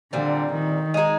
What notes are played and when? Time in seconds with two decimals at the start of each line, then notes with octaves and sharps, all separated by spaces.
0.13 A#2 D3 G3 C4
0.53 D#3
0.94 G#3 D#4 G#4